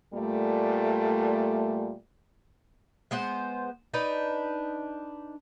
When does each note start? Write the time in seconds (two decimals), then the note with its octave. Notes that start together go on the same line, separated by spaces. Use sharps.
0.14 A#2 G3 A3
3.11 G#3 B3 C5 F#5
3.94 D4 D#4 B4